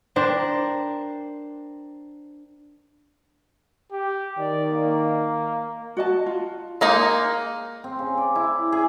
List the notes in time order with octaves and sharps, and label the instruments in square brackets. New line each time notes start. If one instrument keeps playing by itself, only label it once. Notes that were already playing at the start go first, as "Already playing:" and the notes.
[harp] D4 A#4 C5 G5
[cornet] G4
[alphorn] D#3 [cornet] D5
[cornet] A#3
[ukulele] F#4 D#5 A5
F4
[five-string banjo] G#3 A#3 D#4
[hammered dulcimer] C4
C#3
D5
E4
G#4